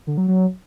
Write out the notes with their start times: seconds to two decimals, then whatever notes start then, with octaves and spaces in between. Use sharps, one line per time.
0.07 D3
0.17 F#3
0.28 F#3